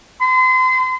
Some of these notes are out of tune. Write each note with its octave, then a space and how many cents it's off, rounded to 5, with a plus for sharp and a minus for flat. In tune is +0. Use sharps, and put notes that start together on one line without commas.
C6 -35